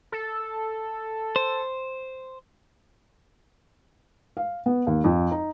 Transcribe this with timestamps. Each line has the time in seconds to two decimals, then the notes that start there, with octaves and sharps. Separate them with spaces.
0.12 A4
1.36 C5
4.37 F5
4.66 B3
4.87 D#2
5.04 F2
5.31 D#4